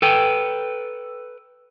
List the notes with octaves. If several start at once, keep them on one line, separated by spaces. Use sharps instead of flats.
A4 B4 G5